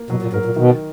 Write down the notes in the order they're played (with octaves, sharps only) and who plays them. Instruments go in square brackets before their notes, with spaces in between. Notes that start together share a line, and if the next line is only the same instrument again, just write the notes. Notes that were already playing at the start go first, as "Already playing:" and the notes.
Already playing: [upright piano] A#3
[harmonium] B2 [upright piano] F#3
[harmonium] A#2
[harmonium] G#2 [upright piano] A#4
[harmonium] A#2
[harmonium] B2 [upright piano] D#3